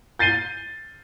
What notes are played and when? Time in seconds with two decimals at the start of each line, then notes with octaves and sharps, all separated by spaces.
0.19 G6 A6 C7 D#7 G7